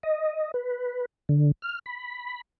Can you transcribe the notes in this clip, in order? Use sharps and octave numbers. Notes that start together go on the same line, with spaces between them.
D#5
B4
D3
F6
B5